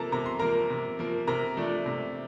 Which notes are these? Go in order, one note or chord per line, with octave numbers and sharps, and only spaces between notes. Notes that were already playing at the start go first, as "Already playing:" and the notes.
Already playing: C3 F3 A#3 A4 A5 A#5
C3 A#5
C6
F3 A#3 A#4 A#5
C3
F3 A#3
C3 A#4 A#5
F3 A3 D4
C3